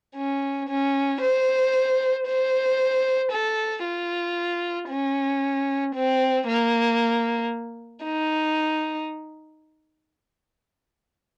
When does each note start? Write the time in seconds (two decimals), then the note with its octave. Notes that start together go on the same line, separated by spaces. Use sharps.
0.15 C#4
0.69 C#4
1.21 C5
2.27 C5
3.32 A4
3.84 F4
4.89 C#4
5.95 C4
6.47 A#3
8.04 D#4